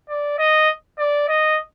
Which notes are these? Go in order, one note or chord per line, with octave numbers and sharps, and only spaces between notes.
D5
D#5
D5
D#5